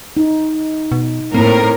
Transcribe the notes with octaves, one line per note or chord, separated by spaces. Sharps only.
D#4
B2
A2 A#3 C4 A#4